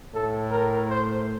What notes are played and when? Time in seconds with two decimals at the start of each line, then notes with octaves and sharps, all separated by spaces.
0.13 A2 A4
0.51 A#4
0.89 C5